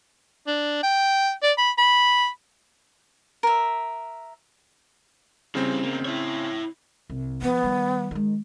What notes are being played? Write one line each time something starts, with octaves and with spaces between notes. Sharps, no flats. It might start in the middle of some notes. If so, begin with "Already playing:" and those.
D4
G5
D5
B5
B5
A#4 E5
C#3 E3 G3 C4
E2 A#3
E4 C#5
C2
F3 B3
D#3 G3
D#3 G#3